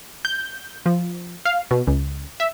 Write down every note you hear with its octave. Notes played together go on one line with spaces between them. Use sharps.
G6
F3
F5
B2
C#2
E5